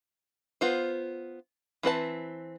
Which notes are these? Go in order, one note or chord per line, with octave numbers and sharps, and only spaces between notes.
B3 F4 C5
E3 C4 B4 A5